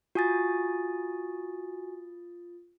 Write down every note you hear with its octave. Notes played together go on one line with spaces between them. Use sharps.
F4 F#4 G#5 D#6 A6